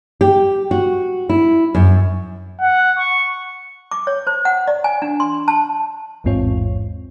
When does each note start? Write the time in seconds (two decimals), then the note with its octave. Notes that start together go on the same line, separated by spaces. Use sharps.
0.21 G4
0.71 F#4
1.29 E4
1.75 F#2
2.61 F#5
2.99 C#6
3.91 D6
4.07 C#5
4.27 C5
4.45 F#5
4.68 D5
4.84 G#5
5.02 D4
5.20 C6
5.48 A5
6.24 A1 E2 G#2 C4 F4 C#5